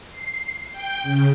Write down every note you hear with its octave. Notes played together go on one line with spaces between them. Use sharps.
C7
G5
C#3